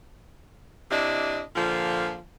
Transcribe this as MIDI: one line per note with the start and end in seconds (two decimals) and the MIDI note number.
0.91 1.41 48
0.91 1.41 62
0.91 1.41 64
0.91 1.41 75
1.56 2.19 46
1.56 2.19 50
1.56 2.19 53